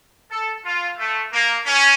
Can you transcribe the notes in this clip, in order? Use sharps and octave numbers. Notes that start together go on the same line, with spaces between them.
A4
F4
A3
A#3
C#4